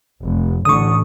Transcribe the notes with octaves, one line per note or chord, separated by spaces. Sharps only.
F1
A1 D3 C#6 D#6